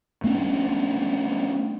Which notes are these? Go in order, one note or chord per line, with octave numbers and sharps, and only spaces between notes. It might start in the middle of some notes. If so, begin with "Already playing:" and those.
A3 B3 C#4 D4